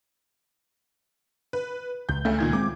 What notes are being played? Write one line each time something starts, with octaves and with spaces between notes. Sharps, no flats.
B4
C#2 G6
D2 C#3 A3
A#2 D#3 G#6
G#3 C4 D6